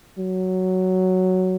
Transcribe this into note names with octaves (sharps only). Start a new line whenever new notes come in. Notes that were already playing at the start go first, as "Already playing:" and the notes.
F#3